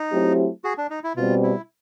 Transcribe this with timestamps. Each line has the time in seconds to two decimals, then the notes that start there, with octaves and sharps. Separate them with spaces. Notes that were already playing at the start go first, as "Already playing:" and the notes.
Already playing: D#4
0.12 F#3 A3 C4 E4 G4
0.64 F#4 G#4
0.78 D4
0.90 D#4
1.04 E4
1.17 B2 G3 C4 F4
1.43 E4